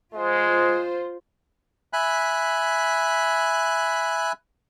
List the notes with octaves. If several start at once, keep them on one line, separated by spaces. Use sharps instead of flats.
G#3 F4 C5
E5 G#5 B5 F#6